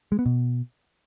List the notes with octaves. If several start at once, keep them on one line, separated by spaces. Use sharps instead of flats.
G#3
B3
B2